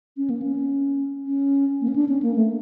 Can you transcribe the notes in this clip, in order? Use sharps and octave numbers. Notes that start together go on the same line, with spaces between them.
C#4
A#3
C#4
C#4
A#3
C#4
D4
C#4
A#3
A3